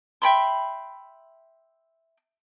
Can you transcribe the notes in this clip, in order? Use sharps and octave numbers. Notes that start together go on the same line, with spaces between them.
E5 G5 B5 C6